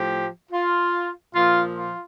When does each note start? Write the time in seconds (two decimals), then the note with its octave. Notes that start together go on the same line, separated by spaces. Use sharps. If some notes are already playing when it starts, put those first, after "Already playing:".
Already playing: A2 F3 G4
0.52 F4
1.34 A#2 F3 F4
1.75 F4